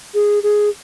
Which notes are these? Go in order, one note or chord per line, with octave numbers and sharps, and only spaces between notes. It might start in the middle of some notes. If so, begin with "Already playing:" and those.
G#4
G#4